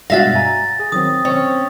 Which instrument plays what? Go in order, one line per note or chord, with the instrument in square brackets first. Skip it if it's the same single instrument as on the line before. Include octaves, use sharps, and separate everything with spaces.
[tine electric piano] G2 B2 G#3 [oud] F#4 E5 F5 [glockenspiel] A6 A#6
[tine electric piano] G#5 A#5
G#4
[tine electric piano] D#3 F#3 C4 [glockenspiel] D#6
[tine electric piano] C4 [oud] C#4